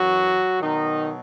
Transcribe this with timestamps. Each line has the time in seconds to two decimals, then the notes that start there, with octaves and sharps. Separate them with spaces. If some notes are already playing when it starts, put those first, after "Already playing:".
Already playing: F#2 E3 F#3 F#4
0.61 B2 D#3 F#3 D#4